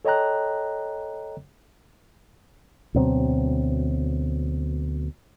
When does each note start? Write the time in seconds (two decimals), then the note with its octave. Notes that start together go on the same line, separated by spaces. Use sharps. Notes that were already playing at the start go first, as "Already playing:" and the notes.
0.05 A4 C#5 D#5 G5 A#5 F#6
2.94 D2 B2 F#3 C4